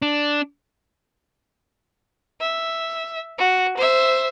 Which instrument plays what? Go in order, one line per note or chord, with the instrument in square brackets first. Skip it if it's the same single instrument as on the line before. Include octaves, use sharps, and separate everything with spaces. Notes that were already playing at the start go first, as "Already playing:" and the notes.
[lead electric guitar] D4
[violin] E5
F#4
C5 E5